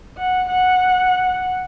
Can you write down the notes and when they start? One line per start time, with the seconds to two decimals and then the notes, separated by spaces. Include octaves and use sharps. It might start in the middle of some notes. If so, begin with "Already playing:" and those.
0.17 F#5
0.49 F#5